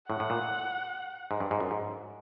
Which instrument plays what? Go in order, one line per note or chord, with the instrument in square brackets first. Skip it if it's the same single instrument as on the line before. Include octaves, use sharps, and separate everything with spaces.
[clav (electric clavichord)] A2 [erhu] F#5
[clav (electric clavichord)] A2
A#2
G#2
G2
G#2
F#2
G#2